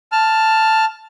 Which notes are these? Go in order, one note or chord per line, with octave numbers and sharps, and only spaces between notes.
A5 F6